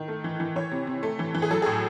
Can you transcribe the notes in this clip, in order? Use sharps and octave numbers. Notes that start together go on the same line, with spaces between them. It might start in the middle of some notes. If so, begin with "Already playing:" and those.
Already playing: D#3
A3
E3
E3
E3 C#5
C3
C3
A3
E3
E3
G#4
F#3 A4
A2 G#4